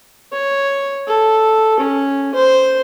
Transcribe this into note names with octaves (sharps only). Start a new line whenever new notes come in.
C#5
A4
C#4
C5